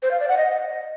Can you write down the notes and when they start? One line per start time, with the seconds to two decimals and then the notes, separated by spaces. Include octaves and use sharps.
0.03 C5
0.11 F5
0.20 D5
0.29 F#5
0.37 D#5